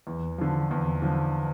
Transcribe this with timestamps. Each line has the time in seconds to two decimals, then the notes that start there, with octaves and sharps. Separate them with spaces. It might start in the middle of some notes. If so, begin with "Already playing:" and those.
0.07 E2
0.38 D3 F3
0.71 E2
1.02 D3 F3